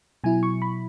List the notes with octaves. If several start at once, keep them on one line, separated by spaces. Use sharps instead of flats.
B2 F#3 E4 G#5
C#6
B5